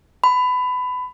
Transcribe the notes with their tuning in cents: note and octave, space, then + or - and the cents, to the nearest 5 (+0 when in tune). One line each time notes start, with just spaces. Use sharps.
B5 +20